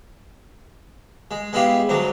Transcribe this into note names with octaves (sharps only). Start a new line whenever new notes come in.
G#3
G#3 B3 E4 F4 G4
D2 G#2 F#3 D4